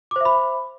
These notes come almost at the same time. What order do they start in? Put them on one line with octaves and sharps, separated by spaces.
D6 C5 E5 B5